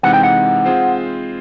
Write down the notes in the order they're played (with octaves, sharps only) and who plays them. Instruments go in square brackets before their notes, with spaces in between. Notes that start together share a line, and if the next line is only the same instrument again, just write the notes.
[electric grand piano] C3 E3 G#3 C4 D#4 [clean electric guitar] F#5
[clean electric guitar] G5
F#5
[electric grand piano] G#3 C4 F4 G#4 C5